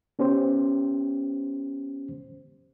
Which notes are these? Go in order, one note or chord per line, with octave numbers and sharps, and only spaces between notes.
B3 C#4 G4 C5